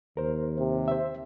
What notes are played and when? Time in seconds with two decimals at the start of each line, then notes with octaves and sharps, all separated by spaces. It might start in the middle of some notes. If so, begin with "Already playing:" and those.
0.17 D#2 A#4 C5
0.59 C3
0.88 C5 E5